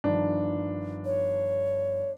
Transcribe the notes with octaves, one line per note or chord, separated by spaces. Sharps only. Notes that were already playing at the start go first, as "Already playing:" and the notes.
G1 D#3 F3 D4
C#5